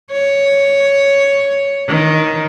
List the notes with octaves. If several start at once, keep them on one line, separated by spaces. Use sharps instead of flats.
C#5
D#3